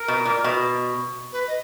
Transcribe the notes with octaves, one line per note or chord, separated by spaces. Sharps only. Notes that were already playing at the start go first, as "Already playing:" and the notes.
Already playing: A#4
B2
A#2
B2
B4
D#5